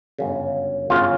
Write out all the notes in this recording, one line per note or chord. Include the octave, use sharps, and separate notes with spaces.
G1 F#2 C#3
G1 F#2 C#3 F4